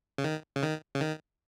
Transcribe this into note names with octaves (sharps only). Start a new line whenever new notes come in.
C#3
D#3
C#3
D#3
C#3
D#3